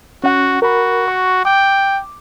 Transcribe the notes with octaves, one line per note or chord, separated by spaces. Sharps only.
C#4 F#4 F#5
F#4 A#4 B5
C#6
G5 D6